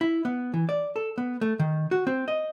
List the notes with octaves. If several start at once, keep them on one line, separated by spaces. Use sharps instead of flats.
E4
B3
E3
D5
A4
B3
A3
D#3
F#4
C4
D#5